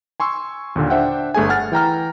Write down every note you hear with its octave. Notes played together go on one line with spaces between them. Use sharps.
G#5 C6 C#6 E6
D#2 A#2 D3
D4 C5 E5 F#5 G5
G1 A3 G#4 G#5
F#5 F6 A6
E3 G5 A#5 F6